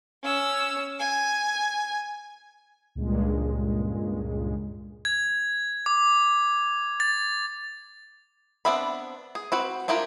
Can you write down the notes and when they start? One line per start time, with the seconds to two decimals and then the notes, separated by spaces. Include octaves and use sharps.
0.23 C#4 E6
0.99 G#5
2.95 C#2 G2 A#2 G#3
5.05 G#6
5.86 D6
7.00 A6
8.65 B3 C4 D4 E5 B5
9.35 G#4
9.52 C4 F#4 B4
9.88 D4 E4 F4 G4 A#4